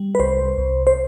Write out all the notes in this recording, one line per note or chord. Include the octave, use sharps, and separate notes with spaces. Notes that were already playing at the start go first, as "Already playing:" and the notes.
Already playing: G3
B4
C2 C5
C2
C5